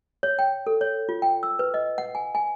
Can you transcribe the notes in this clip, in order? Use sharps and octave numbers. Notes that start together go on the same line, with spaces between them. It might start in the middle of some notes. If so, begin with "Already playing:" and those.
C#5
G5
A4
C#5
F4
G5
E6
B4
D#5
F#5
G#5
G#5